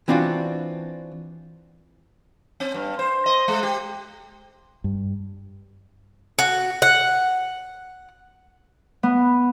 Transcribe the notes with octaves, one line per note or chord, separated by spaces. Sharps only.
E3 C4 D4 F4 F#4
C4
G2
C5
D#5
G#3
G4
G2
F#4
F#5
B3